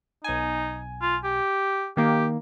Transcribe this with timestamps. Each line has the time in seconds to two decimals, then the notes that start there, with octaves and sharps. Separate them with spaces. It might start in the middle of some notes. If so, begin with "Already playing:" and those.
0.24 B1 D#4 G#5
1.02 F4
1.24 G4
1.97 D#3 A#3 G4